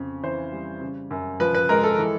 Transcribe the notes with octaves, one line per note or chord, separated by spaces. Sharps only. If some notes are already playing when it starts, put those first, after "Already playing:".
Already playing: F2 C#3
E3 C5
G3
C#3
F#2
F3 B4
B4
G#3 A#4
A4
E3